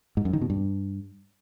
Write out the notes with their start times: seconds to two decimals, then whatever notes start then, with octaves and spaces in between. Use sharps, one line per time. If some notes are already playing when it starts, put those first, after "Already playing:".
0.17 G#2
0.25 F#2
0.33 D#3
0.42 B2
0.50 G2